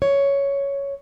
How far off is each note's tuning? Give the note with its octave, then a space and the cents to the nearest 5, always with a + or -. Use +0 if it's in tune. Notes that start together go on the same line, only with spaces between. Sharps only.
C#5 +5